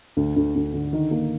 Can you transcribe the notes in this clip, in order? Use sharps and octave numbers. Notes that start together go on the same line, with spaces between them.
D2
D2
D2
D3
D#3
A#3